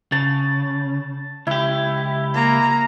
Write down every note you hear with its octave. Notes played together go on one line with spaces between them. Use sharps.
C#3 A5
C#2 E4 G4
A#3 A#5